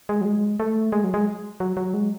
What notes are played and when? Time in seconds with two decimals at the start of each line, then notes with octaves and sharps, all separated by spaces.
0.09 G#3
0.21 F#3
0.25 G#3
0.60 A3
0.92 G#3
1.04 F#3
1.14 G#3
1.60 F#3
1.77 F#3
1.94 G#3